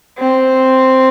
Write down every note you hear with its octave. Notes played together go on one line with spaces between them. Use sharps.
C4